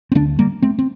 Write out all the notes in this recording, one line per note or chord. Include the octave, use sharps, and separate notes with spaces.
C4
D2 D3 A#3 D4
G3 A#3
A3 C4
C4